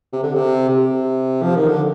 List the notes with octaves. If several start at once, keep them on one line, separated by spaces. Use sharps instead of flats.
C3
D3
C3
C3
F3
D#3
D3